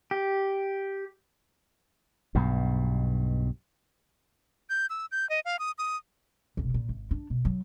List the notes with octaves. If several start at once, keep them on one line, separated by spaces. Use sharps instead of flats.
G4
B1 G2 B2
G6
E6
G6
D#5
F5
D#6
D#6
F1 B1
A#2
G#1
D4
B2
F#3